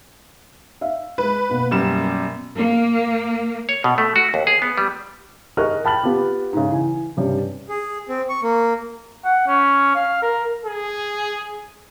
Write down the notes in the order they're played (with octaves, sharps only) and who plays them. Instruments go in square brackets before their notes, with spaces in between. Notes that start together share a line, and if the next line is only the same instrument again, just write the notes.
[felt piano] E5 F5
[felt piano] G#3 [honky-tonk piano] B4
[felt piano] B2 A#3 B3
[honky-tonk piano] F#2 G3 E7
[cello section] A#3
[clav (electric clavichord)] C#5
B2
A3
F#4
D#2
G#4
B3
G3
[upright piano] G#4 A#4 D#5 C#6 F6 F#6
G5 A5 B5 F6 A6 F#7
B3 F4 G4
G#2 C#3
E3 G#5
G2 C3 G3 C#4
[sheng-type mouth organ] G#4
C4
C#6
A#3
[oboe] F#5
C#4
F5
A#4
[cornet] G#4